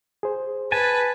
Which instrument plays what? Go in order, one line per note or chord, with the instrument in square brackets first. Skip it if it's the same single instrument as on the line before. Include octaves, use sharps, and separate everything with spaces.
[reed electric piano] G#4 C5
[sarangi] B4 [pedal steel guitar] G#5 A5